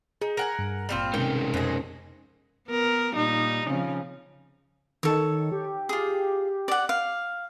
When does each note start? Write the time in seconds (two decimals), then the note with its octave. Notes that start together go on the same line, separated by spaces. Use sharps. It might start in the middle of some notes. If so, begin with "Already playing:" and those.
0.21 D#4 G#4
0.37 A#4 F#5 G#5
0.59 G2
0.89 G#1 A#2 G3 C4 F4 F6
1.14 C3 G#3 C#4 D#4 A#4 G5
1.54 F2 B2 G#4 C5 A#6
2.68 B3 A#4
3.15 A#2 G3 D#4
3.67 C#3 F3 C4
5.03 D#3 A4 C#5
5.52 G4
5.89 F4 G#4
6.68 D5 F#5
6.89 F5